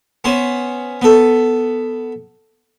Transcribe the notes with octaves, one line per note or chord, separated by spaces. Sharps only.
B3 C#4 C5
B3 A4